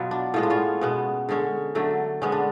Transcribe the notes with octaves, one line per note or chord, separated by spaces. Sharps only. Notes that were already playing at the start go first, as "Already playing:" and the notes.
Already playing: B2 F#3 B3 F4
D4
A2 G#3 B3 F4
D4
C#4 F4
B2 G#3 B3
D3 G#3 C#4
D3 F#3 A3
D3 G#3 B3 C#4
D4